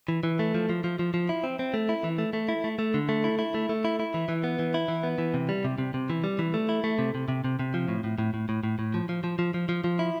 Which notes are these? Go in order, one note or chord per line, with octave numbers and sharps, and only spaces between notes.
E3
E3
A3
F3
F3
F3
F3
F3
E4
C4
C4
A3
E4
E3
A3
A3
E4
A3
A3
D3
A3
E4
E4
A3
A3
E4
E4
E3
E3
B3
E3
E4
E3
B3
E3
C3
G3
C3
C3
C3
E3
G3
E3
A3
E4
A3
C3
C3
C3
C3
C3
F3
A2
A2
A2
A2
A2
A2
A2
F3
F3
F3
F3
F3
F3
F3
E4